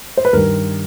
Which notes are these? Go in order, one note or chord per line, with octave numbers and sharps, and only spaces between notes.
C5
B4
G2 D#3 G3 A#4